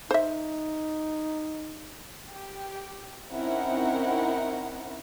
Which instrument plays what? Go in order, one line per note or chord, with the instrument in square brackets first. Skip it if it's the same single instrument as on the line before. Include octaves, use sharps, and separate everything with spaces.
[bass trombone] D#4 [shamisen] C5 E5
[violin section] G4
C4 C#4 D#4 E4 A#4 F#5